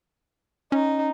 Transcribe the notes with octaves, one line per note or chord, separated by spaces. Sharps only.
C#4 D#4